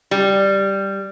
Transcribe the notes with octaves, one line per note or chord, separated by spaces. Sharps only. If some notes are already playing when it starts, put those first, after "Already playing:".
G3